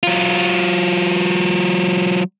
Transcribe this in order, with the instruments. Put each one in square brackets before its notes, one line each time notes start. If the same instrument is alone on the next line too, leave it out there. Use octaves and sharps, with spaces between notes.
[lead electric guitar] F#3 F4